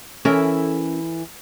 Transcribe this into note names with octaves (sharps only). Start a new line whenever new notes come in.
E3 C#4 E4 A4 A#4